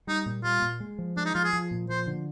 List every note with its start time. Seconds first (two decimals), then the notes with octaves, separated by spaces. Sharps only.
0.07 G3 D#4
0.26 A#2
0.44 G3 F4
0.62 A#2
0.80 G#3
0.99 F3
1.17 G#3 D4
1.26 D#4
1.35 F3 F4
1.44 G#4
1.53 F3
1.71 A#2
1.89 F3 C5
2.07 D3